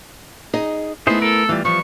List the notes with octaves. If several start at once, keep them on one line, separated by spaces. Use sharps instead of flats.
D#4 G#4 D#5
A3 B3 D#4 E4 G#4 C5
A4 A#4
E3 G3 F4
E3 F3 G3 C#6